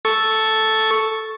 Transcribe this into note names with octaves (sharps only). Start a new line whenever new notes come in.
A4 C#6